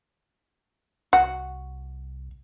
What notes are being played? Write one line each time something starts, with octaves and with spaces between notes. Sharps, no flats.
C2 F#4